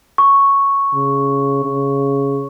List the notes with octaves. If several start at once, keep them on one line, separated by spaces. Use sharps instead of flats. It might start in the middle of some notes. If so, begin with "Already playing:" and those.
C#6
C#3
C#3